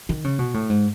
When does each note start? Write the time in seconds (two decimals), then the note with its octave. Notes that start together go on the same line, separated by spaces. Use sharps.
0.09 D#3
0.24 C#3
0.39 B2
0.54 A2
0.70 G#2